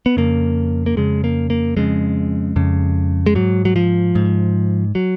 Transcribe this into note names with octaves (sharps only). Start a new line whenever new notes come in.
B3
F2 C#3 A#3
A#3
F2 C#3 G#3
A#3
A#3
F2 C#3 G#3
F2 C#3
G#3
G#2 F#3
F#3
F3
G#2
F#3